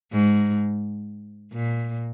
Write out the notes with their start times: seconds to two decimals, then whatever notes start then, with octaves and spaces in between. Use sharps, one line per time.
0.12 G#2
1.53 A#2